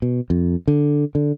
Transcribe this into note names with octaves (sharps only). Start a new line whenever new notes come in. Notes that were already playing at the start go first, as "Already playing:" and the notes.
B2
F2
D3
D3